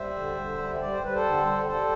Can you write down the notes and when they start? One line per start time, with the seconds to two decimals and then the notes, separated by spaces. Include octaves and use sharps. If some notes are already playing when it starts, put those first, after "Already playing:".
Already playing: G3 C5 E5
0.15 D3
0.37 D3
0.58 G3
0.80 G3 D5
0.91 C5
1.02 G3 B4
1.14 A4 C5
1.24 D3
1.45 G3
1.67 G3 A4 C5